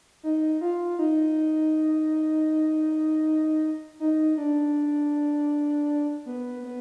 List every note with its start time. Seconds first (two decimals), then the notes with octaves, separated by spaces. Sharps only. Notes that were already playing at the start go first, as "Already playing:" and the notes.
0.23 D#4
0.61 F4
0.99 D#4
4.00 D#4
4.38 D4
6.26 B3
6.64 B3